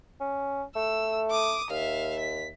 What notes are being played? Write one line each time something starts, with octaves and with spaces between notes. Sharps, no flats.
C#4
A3 E6
D6 D#6
D#2 E5 F5
B6